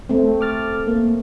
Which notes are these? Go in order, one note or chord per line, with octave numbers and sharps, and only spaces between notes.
A3 C4
D6 F6 A6
A#3